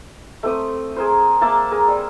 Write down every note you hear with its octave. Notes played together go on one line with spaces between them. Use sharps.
A3 C4 G4 D#6
G#4 A#4 C5
A#3 E5 A5 D6
G#4 A#4
G3